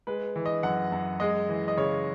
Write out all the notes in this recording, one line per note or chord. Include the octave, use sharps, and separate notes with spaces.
G#3 B4
E3
D#5
F#2 F#5
F#2
G#3 D#5
E3
D#5
C#3 C#5